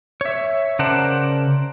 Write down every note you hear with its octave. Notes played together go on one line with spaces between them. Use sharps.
C#5 E5
C#3 A#4 C5 D5 F#5 A5